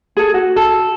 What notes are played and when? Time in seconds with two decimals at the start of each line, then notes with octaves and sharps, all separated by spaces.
0.17 G#4 A4
0.34 F#4
0.56 A4